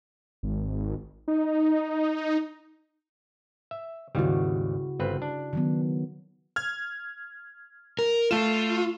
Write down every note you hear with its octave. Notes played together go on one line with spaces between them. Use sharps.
G#1
D#4
E5
G#1 D#2 C#3 G3 E4 F#4
G1 C4 B4
D4
D#3 F#3 B3
F6 G#6
A#4
A3 F4 E7